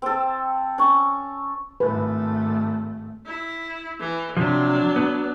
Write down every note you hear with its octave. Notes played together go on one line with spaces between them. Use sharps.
C4 A4
C#4 C#6
G#1 A3 B4
E4
E3
C3 F3 F#3 D4
B3